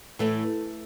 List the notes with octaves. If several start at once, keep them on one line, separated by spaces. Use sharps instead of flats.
A2 E3 A3